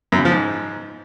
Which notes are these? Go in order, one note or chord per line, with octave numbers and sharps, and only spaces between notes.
F#2
C#3
F3
G#2